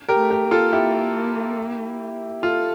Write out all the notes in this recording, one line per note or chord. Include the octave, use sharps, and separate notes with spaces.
G4 A#4
A3
G4 A#4
A#3
F4 A4
E4 G4
F4 A4